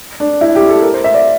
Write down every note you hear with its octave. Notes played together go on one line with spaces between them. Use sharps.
D4
E4
G4
A4
A#4
C5
E5
D5